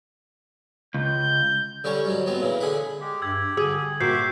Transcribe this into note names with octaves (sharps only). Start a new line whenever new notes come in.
C#2 G6
D3 G3 C#4 C#5
G#2 F#3 G3
F#3 B3 C4
A#2 C#3 E3
D3 G#4 F#5 B5
G#3 G4
G2 G4 E6 G#6
D3 G#4 E6
A#2 F#4 G4 E5 D6 G6 C7